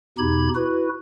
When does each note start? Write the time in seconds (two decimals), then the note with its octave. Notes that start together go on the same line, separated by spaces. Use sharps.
0.18 E2 B2 D#4 G4 B5 G#6
0.55 E4 F#4 B4